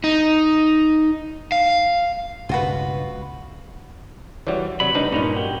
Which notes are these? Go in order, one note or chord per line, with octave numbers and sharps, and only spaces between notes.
D#4
F5
C#2 G2 B2 F4 F#4 B4
E3 G3 F#4 C#5 D5
C3 F#3 G3 D5 B5
G3 A3 D4 D#4 B4
G2 A#2 C#4 D#4
F#4 G4 A#4